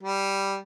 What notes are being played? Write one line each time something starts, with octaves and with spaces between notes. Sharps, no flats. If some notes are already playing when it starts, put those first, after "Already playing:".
G3